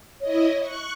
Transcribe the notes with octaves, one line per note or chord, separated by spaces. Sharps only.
E4 C#5 D#5
C#6 F#6